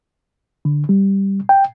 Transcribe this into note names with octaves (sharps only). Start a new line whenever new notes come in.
D3
G3
G5